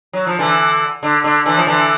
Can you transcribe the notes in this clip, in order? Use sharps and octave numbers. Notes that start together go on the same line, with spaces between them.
F#3
F3
D3 E3
D3
D3
D3 E3
F3
D3 E3